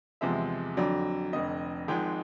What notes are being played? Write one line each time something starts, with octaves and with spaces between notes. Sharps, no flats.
E2 C3 F3 G#3 E5
F2 D3 F#3 D5
F1 F2 D3 D#5
G#1 G#2 F3 G#3 G5